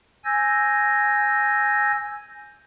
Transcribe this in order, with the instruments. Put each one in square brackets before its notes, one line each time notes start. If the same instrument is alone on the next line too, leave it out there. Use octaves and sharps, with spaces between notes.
[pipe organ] G#5 E6 G6 G#6 A#6